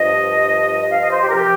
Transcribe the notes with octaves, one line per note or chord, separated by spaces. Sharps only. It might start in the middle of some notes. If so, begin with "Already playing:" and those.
Already playing: G2 F3 D#5
F5
D#5
C5
G4
A#4
C3 F3 G4